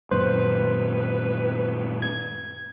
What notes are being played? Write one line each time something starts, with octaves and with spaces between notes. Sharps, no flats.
F#2 A#2 D#3 B4 C5
G#6